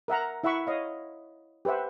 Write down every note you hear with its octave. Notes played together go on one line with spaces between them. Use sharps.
A#4 E5 F#5 A#5
E4 E5 F#5 B5 C#6
C#5 D#5 F5
G4 B4 C5 E5 F#5